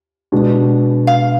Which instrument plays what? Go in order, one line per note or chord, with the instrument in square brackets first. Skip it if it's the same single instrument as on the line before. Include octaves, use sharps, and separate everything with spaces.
[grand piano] B2 G#3 D4 F#4
[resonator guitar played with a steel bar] F5